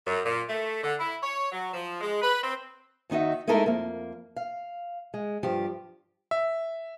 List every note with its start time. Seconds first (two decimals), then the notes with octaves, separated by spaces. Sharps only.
0.06 F#2
0.24 A#2
0.48 A3
0.82 D3
0.99 E4
1.22 C#5
1.51 F#3
1.73 F3
2.01 G#3
2.22 B4
2.42 C4
3.10 D#2 D#3 D#4 F#4 E5
3.47 G#3 A3 D#4 E4 A4 A#4
3.66 F2 A#3
4.36 F5
5.14 G#3
5.43 G2 F3 G4
6.31 E5